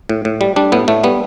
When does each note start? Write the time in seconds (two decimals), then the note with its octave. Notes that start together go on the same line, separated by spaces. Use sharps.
0.09 A2
0.25 A2
0.41 G3
0.56 G3 D4
0.72 A2 B3
0.88 A2 A3
1.04 G3 B3